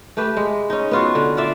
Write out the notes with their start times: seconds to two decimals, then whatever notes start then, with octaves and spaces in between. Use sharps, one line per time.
0.17 A3 G4 B4
0.37 G#3
0.70 C#4 D#4
0.91 B3 F4 F#4
1.15 D3
1.37 F4 D5 E5